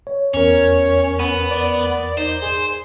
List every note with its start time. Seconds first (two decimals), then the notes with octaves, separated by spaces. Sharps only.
0.07 C#5
0.34 E2 C#4 A#4 C#5
1.19 B3
1.51 D5
2.18 D#4 C5
2.42 G#4